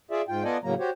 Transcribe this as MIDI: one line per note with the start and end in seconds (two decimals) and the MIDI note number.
0.11 0.22 65
0.11 0.22 68
0.11 0.22 74
0.11 0.22 76
0.29 0.44 44
0.29 0.44 65
0.29 0.44 79
0.44 0.57 59
0.44 0.57 65
0.44 0.57 69
0.44 0.57 74
0.44 0.57 75
0.44 0.57 80
0.64 0.74 45
0.64 0.74 49
0.64 0.74 54
0.64 0.74 58
0.64 0.74 82
0.80 0.90 66
0.80 0.90 67
0.80 0.90 72
0.80 0.90 73